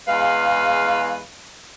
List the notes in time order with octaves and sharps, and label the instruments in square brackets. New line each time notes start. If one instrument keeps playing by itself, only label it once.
[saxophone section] E2 G#3 B4 F5